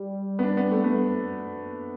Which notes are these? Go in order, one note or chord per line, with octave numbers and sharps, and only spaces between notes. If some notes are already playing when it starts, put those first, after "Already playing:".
Already playing: G3
B3
D4
B3
A3
A3 B3